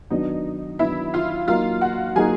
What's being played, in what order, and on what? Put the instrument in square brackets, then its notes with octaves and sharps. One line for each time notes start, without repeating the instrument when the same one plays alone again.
[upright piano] D#3 F#3 B3 D4 [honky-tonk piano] D#4 D#5
[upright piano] D#3 F#3 B3 D4 [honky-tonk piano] E4 E5
[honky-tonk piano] F4 F5
[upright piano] F#3 A#3 D#4 [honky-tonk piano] F4 F5
[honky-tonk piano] F#4 F#5
[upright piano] F#3 A#3 D#4 [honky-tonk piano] G#4 G#5